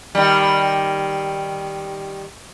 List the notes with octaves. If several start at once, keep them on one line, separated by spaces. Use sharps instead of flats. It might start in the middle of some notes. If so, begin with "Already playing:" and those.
D#3 G3